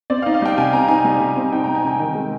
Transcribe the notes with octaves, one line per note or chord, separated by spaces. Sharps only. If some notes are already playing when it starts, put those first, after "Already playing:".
C4 D5
F5
D#4
F5
G3 G5
C3 G#5
C4 A#5
D#4 G#5
G3
C3
C4
D#4 G5
A#5
G3
G#5
C3 G5
D#3
G#3